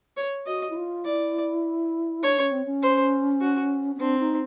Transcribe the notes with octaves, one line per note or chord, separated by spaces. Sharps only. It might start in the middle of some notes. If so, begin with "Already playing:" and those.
C#5
F#4 D#5
E4
F4
E4 D5
D4 C#5
C#4
C4
C#4
C5
F#4
C#4
C4 D4
D#4